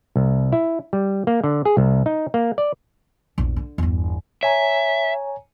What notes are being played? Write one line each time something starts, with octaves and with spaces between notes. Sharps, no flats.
C2
E4
G3
A#3
D3
G#4
C2
D#4
A#3
D5
A#1 E2
D3
G1 E2
C#5 E5 G#5 A#5